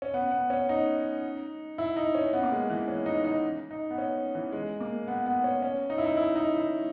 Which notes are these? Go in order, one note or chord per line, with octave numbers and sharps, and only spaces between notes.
C#4
B3
B3
C#4
D#4
E4
D#4
C#4
B3
A#3
G#3
E3
C#4
D#4
D#4
D#4
B3
C#4
E3
G#3
A#3
B3
B3
C#4
C#4
D#4
E4
D#4
E4
D#4
E4